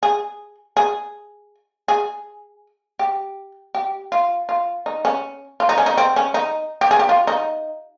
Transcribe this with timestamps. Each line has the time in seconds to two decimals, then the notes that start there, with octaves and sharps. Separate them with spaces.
0.03 G#4
0.77 G#4
1.88 G#4
2.99 G4
3.75 G4
4.12 F4
4.49 F4
4.86 D#4
5.05 C#4
5.60 F4
5.69 D#4
5.78 C#4
5.86 D#4
5.97 C4
6.16 C#4
6.34 D#4
6.81 G4
6.91 G#4
6.99 G4
7.09 F4
7.27 D#4